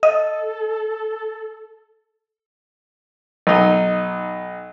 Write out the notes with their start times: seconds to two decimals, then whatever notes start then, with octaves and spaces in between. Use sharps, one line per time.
0.03 A4 D#5
3.47 B1 D#4